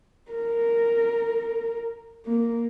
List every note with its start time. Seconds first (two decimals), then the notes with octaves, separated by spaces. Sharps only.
0.32 A#4
2.26 A#3